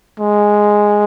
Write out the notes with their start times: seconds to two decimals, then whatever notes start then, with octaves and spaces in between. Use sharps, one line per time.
0.20 G#3